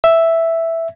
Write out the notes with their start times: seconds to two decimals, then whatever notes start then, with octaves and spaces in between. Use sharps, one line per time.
0.04 E5